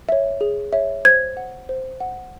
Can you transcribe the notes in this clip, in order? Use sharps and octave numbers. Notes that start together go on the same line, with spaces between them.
C#5 E5
G#4
C#5 E5
C5 G#6
F#5
C5
F#5